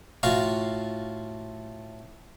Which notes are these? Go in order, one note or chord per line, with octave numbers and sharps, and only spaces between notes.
A2 F4 F#4 F5